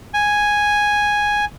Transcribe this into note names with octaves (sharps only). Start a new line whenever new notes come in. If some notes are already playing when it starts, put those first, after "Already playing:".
G#5